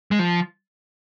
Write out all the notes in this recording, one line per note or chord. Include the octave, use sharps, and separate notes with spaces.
G#3
F3